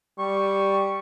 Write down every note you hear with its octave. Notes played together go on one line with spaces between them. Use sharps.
G3 C#6